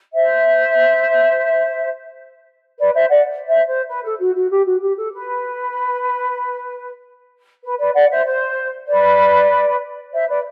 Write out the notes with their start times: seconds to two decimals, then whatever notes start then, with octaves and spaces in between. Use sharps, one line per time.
0.13 C5 E5
2.78 B4 D5
2.94 C5 E5
3.10 D5 F#5
3.46 C5 E5
3.67 C5
3.88 B4
4.03 A4
4.19 F#4
4.35 F#4
4.51 G4
4.65 F#4
4.81 G4
4.98 A4
5.13 B4
7.63 B4
7.78 B4 D5
7.94 D5 F#5
8.10 C5 E5
8.25 C5
8.88 B4 D5
10.12 C5 E5
10.28 B4 D5